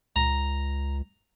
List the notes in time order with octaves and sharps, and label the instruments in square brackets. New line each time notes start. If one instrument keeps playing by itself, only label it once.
[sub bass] C#2 [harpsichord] A#5